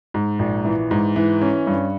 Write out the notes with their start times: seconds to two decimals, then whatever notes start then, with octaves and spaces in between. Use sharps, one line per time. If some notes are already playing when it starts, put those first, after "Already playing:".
0.14 G#2
0.39 A#1
0.65 E3
0.91 G#2
1.16 E3
1.42 C#4
1.67 G2